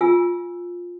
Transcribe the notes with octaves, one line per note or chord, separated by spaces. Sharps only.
F4 G#5 E6